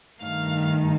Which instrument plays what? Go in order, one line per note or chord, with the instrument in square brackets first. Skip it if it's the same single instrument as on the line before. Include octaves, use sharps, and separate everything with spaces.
[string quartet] G2 D#3 A3 F5